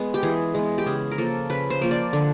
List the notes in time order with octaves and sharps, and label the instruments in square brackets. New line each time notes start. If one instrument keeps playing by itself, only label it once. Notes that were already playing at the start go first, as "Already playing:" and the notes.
Already playing: [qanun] G#3 B3
G4
E3 G#4
G#3 B3
G4
C#3 G#4
A#4
F3 A#3 A4
C#3 B4
C5
F3 A#3
D5
D3